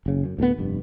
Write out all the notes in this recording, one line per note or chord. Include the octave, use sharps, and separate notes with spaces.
F#1 C#3
F#2
D2 A2 G3 B3
F1 G2